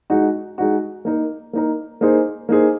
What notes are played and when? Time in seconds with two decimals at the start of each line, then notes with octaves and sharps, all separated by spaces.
0.10 G#3 D#4 F#4
0.58 G#3 D#4 F#4
1.05 A#3 D#4 A#4
1.53 A#3 D#4 A#4
2.01 A#3 D#4 G#4 C5
2.49 A#3 D#4 G#4 C5